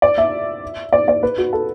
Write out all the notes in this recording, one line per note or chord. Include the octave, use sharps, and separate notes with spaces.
D5
E5
D5
D5
B4
F#4
A4